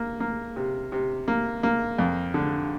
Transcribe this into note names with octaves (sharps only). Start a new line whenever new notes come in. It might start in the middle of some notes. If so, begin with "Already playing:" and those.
Already playing: A#3
A#3
C3
C3
A#3
A#3
F2
D3